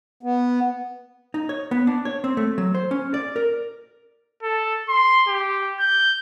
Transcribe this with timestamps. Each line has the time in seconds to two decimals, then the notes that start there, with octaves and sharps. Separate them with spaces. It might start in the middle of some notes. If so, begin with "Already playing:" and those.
0.23 B3
1.34 D#4
1.49 C#5
1.71 B3
1.87 D4
2.05 C#5
2.24 C4
2.37 A3
2.58 F#3
2.75 C5
2.91 C#4
3.14 D5
3.36 A#4
4.43 A4
4.89 C6
5.27 G4
5.79 G6